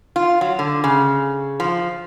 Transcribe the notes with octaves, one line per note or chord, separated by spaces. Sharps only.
F4
F#3
D3
C#3
F3